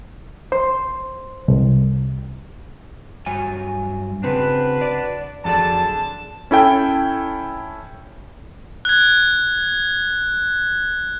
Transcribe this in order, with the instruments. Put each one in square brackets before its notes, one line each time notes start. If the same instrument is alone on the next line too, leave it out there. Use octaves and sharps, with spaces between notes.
[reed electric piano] C5 C6
C2
[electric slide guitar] G2 F#3 G#5
[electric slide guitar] C#3 C4 [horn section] D4 F#4 B4
[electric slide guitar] D5
[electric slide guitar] F2 F#3 D5 [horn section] D3 G#4 A5
[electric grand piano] C#4 E4 A4 G5
[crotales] F#6 G#6